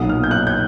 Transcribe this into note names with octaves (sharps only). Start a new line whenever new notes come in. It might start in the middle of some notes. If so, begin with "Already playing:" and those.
Already playing: B1 A#2 F#3 D#6
F6
G6
F#6
G6